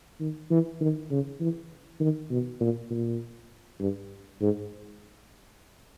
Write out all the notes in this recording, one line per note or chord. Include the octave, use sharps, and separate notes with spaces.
D#3
E3
D#3
C#3
E3
D#3
B2
A#2
A#2
G2
G#2